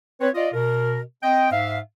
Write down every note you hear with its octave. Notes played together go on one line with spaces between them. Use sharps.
C4 B4 C#5
F4 D5 D#5
B2 A#4
C4 D#5 G5
G#2 E5 F5